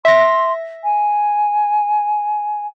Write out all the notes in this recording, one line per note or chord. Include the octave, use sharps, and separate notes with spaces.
E5 C6 A#6
G#5